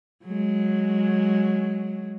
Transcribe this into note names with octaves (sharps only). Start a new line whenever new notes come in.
F#3 G#3